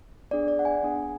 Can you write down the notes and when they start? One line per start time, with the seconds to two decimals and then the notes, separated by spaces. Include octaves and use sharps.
0.31 B3 D4 G#4 D5
0.48 D5
0.59 F#5
0.65 G#5
0.83 B3 D4 G#4